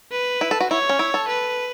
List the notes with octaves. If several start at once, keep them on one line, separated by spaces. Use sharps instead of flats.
B4
E4
A4
F#4
E4 C#5
C#4
E4
A4
B4